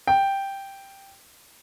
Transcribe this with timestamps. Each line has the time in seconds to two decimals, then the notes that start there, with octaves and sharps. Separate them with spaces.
0.07 G5